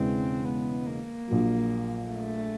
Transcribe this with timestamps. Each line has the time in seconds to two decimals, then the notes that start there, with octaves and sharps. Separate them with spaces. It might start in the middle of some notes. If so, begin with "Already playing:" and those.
Already playing: E1 E2 C#3 E3 G#3 C4
0.45 B3
0.86 A#3
1.27 A#1 A#2 F#3
2.10 A3